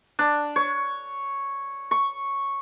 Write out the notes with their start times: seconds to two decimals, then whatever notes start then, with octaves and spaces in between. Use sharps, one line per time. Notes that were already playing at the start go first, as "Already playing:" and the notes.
0.19 D4
0.56 C#5
1.91 C#6